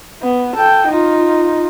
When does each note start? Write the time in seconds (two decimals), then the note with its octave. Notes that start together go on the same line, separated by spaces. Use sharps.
0.22 B3
0.55 A4 G5
0.88 D#4 F4